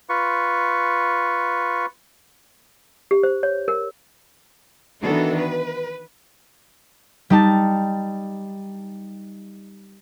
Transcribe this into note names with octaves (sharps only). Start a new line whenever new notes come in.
F4 B4 C#6
G4
C5
C#5
A#4
D#3 E3 B3 D4 F#4 A4
B4
G3 D#4 A5